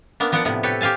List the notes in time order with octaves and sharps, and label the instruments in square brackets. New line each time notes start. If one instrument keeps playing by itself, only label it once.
[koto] A#3 B3 D4
F3 B3 D4 D5 F#5
A2 C3 F3 B3
G4 A4 B4 C#5
G4 C5 F5 G#5 A5